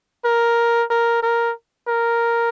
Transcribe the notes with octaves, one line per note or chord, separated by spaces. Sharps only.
A#4
A#4
A#4
A#4